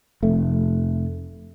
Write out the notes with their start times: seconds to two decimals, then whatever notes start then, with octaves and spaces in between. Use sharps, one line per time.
0.23 F1 A3